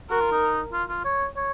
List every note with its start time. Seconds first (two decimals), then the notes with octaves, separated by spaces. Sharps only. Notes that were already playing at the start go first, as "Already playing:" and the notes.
0.10 F#4 A#4
0.20 F4
0.31 D#4
0.72 F4
0.89 F4
1.05 C#5
1.36 C#5